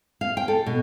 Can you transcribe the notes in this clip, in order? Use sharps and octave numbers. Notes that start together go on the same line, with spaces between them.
F5
G5
A4
B2